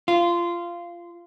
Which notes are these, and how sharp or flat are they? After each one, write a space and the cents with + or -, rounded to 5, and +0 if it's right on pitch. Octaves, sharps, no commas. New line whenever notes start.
F4 -15